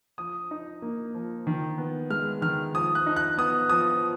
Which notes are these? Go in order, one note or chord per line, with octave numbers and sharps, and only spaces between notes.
F3 D#6
D#4
A#3
F3
D#3
B3
G#3 F6
D#3 F6
F3 D#6
F#6
D#4
F#6
B3 D#6
F3 D#6